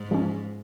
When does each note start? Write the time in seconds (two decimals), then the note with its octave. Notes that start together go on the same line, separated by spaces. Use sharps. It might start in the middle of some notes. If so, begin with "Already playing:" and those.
Already playing: G#2
0.11 F3 G#3 C#4